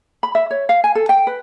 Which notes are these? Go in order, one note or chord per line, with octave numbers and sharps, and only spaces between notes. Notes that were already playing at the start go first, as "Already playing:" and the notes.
B5
E5
C#5
F5
G#5
A4
G5
B4